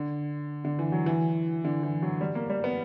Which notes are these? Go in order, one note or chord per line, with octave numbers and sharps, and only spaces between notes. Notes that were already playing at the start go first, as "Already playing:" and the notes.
Already playing: D3
D3
E3
F#3
E3
D3
E3
F#3
G3
A#3
G3
B3